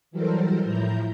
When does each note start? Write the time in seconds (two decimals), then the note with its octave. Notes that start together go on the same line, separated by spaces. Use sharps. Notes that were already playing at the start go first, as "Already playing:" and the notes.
0.11 E3 F#3 G3 A4 A#4 C5
0.63 A2 F3 E4 A#5 G6